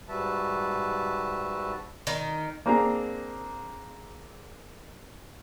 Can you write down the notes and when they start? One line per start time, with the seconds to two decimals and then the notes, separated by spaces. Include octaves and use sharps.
0.08 G#2 G3 F#4 B4 E5 A5
2.07 D#3
2.66 A#3 C4 D4 G#4 A#5